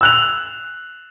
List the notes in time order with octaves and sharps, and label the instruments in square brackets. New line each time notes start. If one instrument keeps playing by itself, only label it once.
[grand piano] E6 F#6 F7